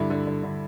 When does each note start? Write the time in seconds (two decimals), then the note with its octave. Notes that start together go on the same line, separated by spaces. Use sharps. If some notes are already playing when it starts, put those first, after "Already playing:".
Already playing: G2 D3 E4
0.10 D3
0.27 D3
0.44 D3